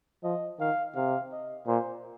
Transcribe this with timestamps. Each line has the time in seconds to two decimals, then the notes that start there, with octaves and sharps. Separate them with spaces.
0.23 F3 D#5
0.60 D#3 F5
0.95 C3 F5
1.32 D#5
1.67 A#2 C5